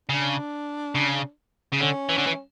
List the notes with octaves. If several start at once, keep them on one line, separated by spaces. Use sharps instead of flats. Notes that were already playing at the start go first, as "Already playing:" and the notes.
C#3 D4
C#3
C#3
D3 C#4
E3
D3
E3